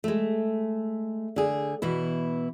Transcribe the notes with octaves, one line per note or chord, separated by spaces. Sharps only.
G#3 A3
D3 G#4
B2 E3 E4